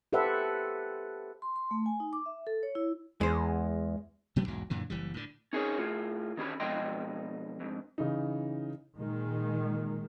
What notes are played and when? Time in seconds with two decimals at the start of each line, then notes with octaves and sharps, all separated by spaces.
0.13 G4 A4 B4 C5 E5 F#5
1.42 C6
1.56 C6
1.71 A3
1.86 G#5
2.00 D#4
2.13 D6
2.26 E5
2.47 A4
2.63 C#5
2.75 E4
3.21 E2 G#3 C5
4.36 B2 F#3 A3 B3
4.48 B1 E2 G#2 F#3
4.70 F#2 A#2 D3 E3
4.90 F#1 E3 G3
5.14 A2 D3
5.53 C#4 D#4 G#4 A#4 B4 C#5
5.77 A2 F4 G#4
6.37 D#3 C#4 G4 B5
6.60 B2 F3 G#3 D#5 G5 C6
7.60 F2 G#2
7.98 C#3 E3 D#4
8.97 A#2 D#3 G#3